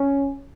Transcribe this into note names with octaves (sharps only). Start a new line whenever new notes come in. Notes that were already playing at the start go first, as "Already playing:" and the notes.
Already playing: C#4